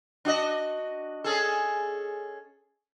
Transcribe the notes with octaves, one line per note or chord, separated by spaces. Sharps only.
D4 F#4 D#5
C#4 G#4 A4